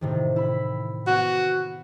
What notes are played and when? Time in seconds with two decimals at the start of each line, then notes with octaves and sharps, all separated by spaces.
0.01 A2 C3 D#3
0.36 E4 B5
1.07 B3 F#4